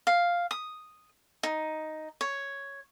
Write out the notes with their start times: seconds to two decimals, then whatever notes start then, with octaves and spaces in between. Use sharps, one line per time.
0.07 F5
0.51 D#6
1.43 D#4
2.21 C#5